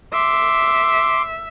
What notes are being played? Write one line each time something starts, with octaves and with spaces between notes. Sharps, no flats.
E5 C6 D6